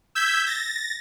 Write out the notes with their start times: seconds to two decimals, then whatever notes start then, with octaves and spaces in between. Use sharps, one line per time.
0.15 E6 G6 G#6 B6
0.47 A6 A#6